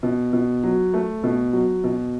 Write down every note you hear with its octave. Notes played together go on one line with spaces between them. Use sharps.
B2
B2
F#3
A3
B2
F#3
B2